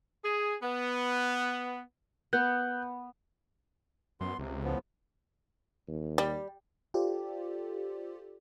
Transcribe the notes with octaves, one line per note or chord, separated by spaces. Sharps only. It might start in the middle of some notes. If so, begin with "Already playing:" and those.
G#4
B3
B3 F#6 G6
F#2 B3 C6
C#2 C3
A2 F3 B3
D#2
G3
F4 G4 A4 C5 D5